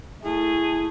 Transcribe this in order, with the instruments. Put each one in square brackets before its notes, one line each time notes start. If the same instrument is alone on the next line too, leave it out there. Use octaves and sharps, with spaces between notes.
[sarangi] A3 [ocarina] E4 [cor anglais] G#4